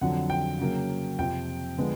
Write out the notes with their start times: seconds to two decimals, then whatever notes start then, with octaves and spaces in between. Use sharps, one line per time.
0.01 F2 D3 F#3 F#5
0.30 G5
0.59 C#3 F#3 A#3
1.18 F2 C3 F3 G5
1.78 D3 F3 G#3 B3